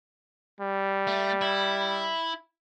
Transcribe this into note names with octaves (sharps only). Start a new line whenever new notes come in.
G3
A3
E4